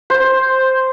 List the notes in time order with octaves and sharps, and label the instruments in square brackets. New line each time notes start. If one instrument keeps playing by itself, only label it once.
[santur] C5